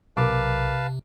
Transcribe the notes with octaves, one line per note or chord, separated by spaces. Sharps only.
B1 C3 A#4 B4 F5 A5 D6